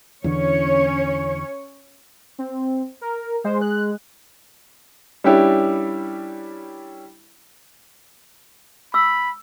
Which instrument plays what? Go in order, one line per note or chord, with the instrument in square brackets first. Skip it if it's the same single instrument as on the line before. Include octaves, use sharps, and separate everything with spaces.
[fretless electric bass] E2 D3 E3 [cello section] C#4 C#5
[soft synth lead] C4
A#4
[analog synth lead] G#3 [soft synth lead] C5
[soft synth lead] F#6
[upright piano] G3 C#4 D4 E4 G4
[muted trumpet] B5 [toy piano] E6